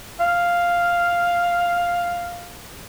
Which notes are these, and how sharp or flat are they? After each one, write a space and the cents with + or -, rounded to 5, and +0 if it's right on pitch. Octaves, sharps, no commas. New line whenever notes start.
F5 +0